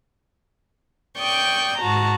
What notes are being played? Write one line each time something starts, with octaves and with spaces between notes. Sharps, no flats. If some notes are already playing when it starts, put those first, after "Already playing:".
D5 G5 C#6 D#6 G6
G#2 F#4 A5 A#5